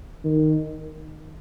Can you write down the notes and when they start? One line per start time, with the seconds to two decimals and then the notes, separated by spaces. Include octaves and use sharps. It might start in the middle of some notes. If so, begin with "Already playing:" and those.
0.24 D#3